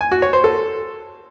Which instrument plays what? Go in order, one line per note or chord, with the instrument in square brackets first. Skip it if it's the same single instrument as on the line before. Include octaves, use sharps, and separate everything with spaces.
[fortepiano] G#5
F#4
C#5
C5
A4